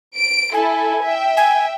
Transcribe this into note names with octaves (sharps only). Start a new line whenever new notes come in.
D7
E4 A4 G#5
E5 G5
G#5